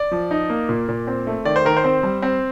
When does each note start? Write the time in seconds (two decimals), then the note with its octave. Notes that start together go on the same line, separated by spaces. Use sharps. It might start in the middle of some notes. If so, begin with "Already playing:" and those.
Already playing: D5
0.11 F3
0.31 D#4
0.50 A#3
0.69 A#2
0.89 A#2
1.07 C4
1.27 A3
1.45 D#3 D5
1.56 C5
1.65 D#3 A#4
1.77 C5
1.84 C4
2.03 G3
2.23 C4